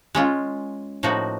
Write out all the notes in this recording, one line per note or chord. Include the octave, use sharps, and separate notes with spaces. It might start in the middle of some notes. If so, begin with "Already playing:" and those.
G#3 C#4 F4
A2 F3 A#3 D#4 F#4